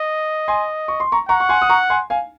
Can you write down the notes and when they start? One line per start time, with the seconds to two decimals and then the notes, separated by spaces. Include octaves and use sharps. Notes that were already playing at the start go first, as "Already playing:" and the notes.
Already playing: D#5
0.48 G#5 C6
0.88 C#6
1.00 C6
1.12 A#5 C#6
1.29 F#5 A#5 C#6
1.40 C#6
1.49 G#5 C6
1.62 D#6
1.69 A#5 C#6
1.90 G#5 C6
2.10 F5 G#5